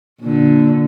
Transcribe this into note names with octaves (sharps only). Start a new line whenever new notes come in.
A#2 D3